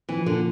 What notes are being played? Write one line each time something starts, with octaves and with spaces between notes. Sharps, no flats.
E3 F3
A#2 D3